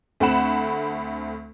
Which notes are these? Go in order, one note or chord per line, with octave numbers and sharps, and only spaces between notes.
D2 A3 C4 F#5 B5 E7